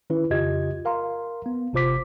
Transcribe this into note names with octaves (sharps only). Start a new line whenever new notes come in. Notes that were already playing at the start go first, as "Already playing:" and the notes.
D#3 C#4 E4 B4
F2 C#3 F4 G4 D#5 G#6
A#4 F5 A#5 C6
B3
G1 C3 F4 C5 D6 B6